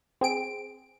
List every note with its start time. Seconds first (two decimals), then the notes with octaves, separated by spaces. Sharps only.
0.21 C4 G#4 D7